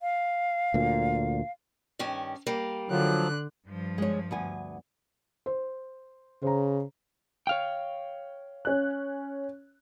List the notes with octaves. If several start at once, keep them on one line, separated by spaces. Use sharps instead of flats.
F5
D2 A#2
G2 D#3 C#4
G3 A#3
D3 F3 F#3 F#6
G2 F3
G#3 C#5
D2 B3 G#5
C5
C#3 C5 A#5
C#5 F5 G5
C#4 F#6